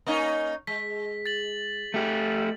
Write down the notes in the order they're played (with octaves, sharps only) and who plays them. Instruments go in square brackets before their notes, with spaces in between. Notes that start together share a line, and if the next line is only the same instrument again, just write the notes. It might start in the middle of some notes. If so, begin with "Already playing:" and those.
[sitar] A#3 C#4 D#4
[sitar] G#3 [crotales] B6
[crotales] A6 B6 F#7
[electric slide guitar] A3 G4